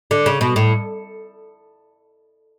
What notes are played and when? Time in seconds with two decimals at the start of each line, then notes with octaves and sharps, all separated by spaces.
0.11 D3
0.26 C#3
0.41 B2
0.56 A2